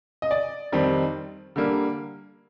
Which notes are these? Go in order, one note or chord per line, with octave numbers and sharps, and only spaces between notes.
D#5
D5
F2 D#3 G3 C4
D3 G3 A#3